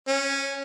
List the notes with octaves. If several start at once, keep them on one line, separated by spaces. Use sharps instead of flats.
C#4